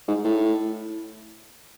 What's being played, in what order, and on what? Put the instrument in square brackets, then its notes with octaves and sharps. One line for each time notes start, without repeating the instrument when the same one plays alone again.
[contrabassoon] G#2
A2